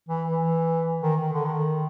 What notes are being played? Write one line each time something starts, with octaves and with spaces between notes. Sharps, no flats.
E3
E3
D#3
D#3
D3
D#3